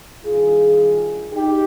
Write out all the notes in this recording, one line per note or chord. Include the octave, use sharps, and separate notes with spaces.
G2 D#3 F4 G#4
D#4 G4